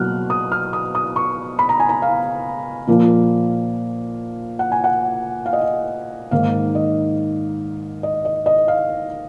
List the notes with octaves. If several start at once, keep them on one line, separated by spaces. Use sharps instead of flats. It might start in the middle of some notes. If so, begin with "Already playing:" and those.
Already playing: B2 F#3 A#3 F6 F#6
D#6
F6
D#6
D#6
C#6
B5
A#5
G#5
A#5
F5
A#2 F3 A#3
F#5
G#5
F#5
F5
D#5
F5
G#2 D#3 A#3 F5
D#5
D#5
D#5
D#5
F5